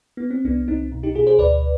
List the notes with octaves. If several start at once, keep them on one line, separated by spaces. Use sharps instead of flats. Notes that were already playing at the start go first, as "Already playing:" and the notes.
B3
C4
C2 B3 D4
C2 C4 D#4
B2
D#4 G4
B2 F4 G#4
G#4 C5
D2 B4 D5